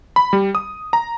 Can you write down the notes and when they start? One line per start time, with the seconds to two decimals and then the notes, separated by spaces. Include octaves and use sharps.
0.16 B5
0.33 G3
0.55 D#6
0.93 A#5